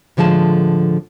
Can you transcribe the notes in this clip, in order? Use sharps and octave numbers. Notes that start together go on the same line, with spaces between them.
A2 D3 F3 G#3 A5